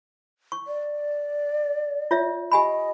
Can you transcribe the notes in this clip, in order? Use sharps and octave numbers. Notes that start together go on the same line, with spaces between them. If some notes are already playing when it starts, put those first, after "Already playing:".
C#6
D5
F4 C#5 E5
G4 D#5 G#5 B5